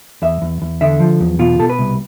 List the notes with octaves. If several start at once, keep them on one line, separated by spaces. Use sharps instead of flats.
E2 E5
E2
E2
D3 E5
F3
E2
B2 F4
B2 A4
B4
C2